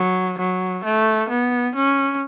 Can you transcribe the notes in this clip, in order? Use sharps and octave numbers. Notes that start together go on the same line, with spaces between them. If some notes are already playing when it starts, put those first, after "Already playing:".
Already playing: F#3
F#3
A3
B3
C#4